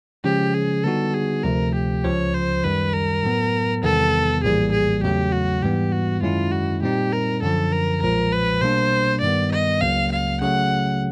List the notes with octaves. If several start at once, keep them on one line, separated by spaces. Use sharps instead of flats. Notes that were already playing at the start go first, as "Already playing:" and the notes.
C#3 F3 G#3 C#4 G4
G#4
D3 G3 B3 D#4 F#4 A4
G#4
D2 C3 F3 A3 A#4
G4
C#2 C#3 F3 C#5
C5
F#2 D#3 G3 B4
A#4
A2 F#3 B3
E2 C3 D#3 G3 B3 A4
A#1 A2 E3 G3 A#3 G#4
G#4
E2 C#3 F#3 A3 G4
F#4
G#2 E3 G3 B3 G4
F#4
F#2 D#3 G#3 C#4 E4 F4
F#4
A#2 G3 C4 D#4 G4
A#4
F#2 D3 F3 A4
A#4
B1 A#2 F3 G#3 A#4
B4
B2 G3 A#3 D4 C5
G2 D#3 G3 B3 D5
D#5
C#2 C#3 F#3 A#3 F5
F5
C#3 F#3 A3 F#5